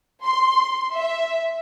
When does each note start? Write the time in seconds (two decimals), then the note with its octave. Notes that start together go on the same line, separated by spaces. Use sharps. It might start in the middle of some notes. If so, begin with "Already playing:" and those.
0.24 C6
0.93 E5